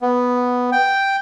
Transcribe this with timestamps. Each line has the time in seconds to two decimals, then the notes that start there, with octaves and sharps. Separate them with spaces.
0.02 B3
0.72 G5